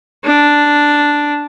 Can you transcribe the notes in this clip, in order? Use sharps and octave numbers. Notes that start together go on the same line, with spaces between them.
D4